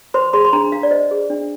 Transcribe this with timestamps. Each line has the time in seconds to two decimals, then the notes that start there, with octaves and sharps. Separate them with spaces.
0.14 C5 C6
0.33 G#4 C6
0.45 C6
0.53 D4 A#5
0.72 D4 F5
0.83 D5
0.91 C5 D#5
1.11 G#4
1.30 D4